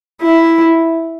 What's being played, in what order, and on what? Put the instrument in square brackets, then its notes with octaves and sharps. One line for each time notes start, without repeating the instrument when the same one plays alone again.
[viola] E4